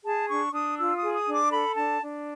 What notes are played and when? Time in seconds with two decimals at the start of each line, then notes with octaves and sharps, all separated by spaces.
0.05 G#4 A5
0.29 D4 C#6
0.53 D4 D#6
0.78 F4 E6
0.97 D#6
1.03 G#4
1.15 D#6
1.27 D4
1.34 D6
1.51 A4 B5
1.76 D4 A5
2.01 D4